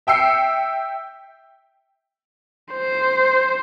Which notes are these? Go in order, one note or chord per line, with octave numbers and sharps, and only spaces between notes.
E5 G5 E6 C7 C#7
C5